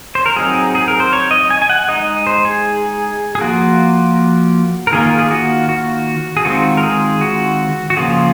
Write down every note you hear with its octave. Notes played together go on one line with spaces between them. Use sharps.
C5
A#4
F#3 C4 D#4 G#4
G#4
A#4
C5
C#5
D#5
G#5
G#5
F#5
G#3 D#4 D#5
C5
G#4
G#4
F3 A#3 F4 F#4
A#4
D#3 A#3 F4 G#4
G#4
F#4
F#4
G#4
D#3 G#3 C4 F4 F#4
A#4
G#4
F#4
F#4
C#3 F3 A#3 F4 G#4